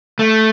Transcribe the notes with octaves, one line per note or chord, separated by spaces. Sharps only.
A3